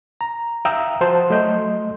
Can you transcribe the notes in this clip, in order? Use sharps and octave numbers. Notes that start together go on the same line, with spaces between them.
A#5
E5 F5 G5 A#5 D#6 E6
F3 F#4 C5 F#5 A5
F#3 A3 D#5 C6 G6